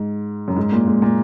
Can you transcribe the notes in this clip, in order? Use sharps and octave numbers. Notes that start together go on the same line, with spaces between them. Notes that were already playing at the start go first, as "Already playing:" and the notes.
Already playing: G#2
F#2
G#2
A#2
G#2
A#2